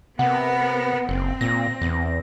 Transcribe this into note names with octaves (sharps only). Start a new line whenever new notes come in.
C3 B3 A#4 F#5
F#1 C4
A#2 A#6
E2